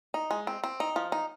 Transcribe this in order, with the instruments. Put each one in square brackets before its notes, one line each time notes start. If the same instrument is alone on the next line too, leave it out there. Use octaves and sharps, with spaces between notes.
[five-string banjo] D#4
G#3
C4
C4
D#4
F3
D#4